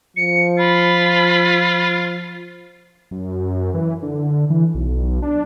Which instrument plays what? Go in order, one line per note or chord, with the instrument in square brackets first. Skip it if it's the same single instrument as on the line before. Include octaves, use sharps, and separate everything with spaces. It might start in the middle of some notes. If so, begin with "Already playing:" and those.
[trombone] F3 [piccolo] C#7
[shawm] F4 [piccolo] B5
[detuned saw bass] F#2
E3
D3
E3
B1
D4